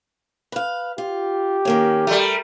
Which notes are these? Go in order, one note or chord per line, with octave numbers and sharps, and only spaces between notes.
B4 F5
F4 G4
D#3 A#3 C#4
G3 A3 A#4